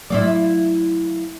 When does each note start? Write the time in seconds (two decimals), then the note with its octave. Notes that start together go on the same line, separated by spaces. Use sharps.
0.10 F#3 A3 E4 F4 D5